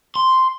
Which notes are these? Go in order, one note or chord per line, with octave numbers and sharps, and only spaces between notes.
C6